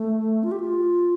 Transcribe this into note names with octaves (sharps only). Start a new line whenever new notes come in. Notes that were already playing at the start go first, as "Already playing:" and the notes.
Already playing: A3
F4
G4
F4